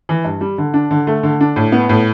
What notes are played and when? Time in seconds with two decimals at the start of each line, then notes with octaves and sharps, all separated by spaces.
0.09 E3
0.24 G2
0.41 G3
0.58 D3
0.74 D4
0.91 D3
1.07 A3
1.23 D3
1.41 D4
1.56 A2
1.72 B3
1.89 A2